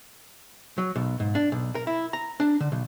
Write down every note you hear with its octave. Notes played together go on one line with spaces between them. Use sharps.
F#3
B1
G#2
D4
B1
A#4
E4
A#5
D4
D3
B1